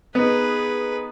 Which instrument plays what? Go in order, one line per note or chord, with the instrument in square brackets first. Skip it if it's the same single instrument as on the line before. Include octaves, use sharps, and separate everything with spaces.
[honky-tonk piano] B3 D#4 [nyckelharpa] G#4 B4